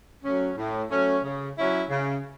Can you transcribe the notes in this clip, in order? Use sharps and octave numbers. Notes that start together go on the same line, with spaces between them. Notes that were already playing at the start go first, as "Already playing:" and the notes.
F#3 A3 C#4
A2
F#3 A3 C#4
C#3
F#3 C#4 E4
C#3